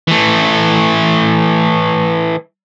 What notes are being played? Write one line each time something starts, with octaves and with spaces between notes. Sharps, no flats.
E3 A3